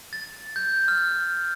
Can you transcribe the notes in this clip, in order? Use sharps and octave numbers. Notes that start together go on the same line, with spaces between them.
A6
G6
F6